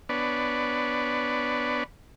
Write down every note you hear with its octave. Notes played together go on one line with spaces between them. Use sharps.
B3 D4 B4 C#5 D5